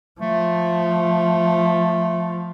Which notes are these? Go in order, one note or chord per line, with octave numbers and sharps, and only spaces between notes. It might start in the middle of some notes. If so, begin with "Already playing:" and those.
F3 A3